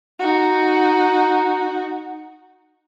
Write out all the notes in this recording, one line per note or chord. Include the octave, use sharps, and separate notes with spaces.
D#4 F#4